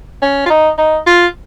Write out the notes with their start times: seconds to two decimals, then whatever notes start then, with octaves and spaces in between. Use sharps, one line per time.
0.22 C#4
0.46 F4
0.50 D#4
0.78 D#4
1.06 F4